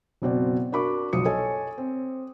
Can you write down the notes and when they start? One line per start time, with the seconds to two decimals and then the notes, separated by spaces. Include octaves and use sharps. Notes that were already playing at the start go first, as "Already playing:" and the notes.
0.22 F#1 B2 C4 D5
0.72 D4 F#4 A#4 B5 C#6 D6
1.13 F#1 B1 F3 D#6 C#7
1.25 A4 C#5 D#5 G#5
1.78 C4